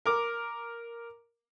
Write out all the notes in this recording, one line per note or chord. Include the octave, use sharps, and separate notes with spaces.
A#4 D6